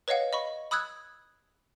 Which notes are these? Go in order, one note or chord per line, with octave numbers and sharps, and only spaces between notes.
B4 C#5 D#5 F5 F#5
D#5 B5 C#6
B5 D#6 E6 F#6 G#6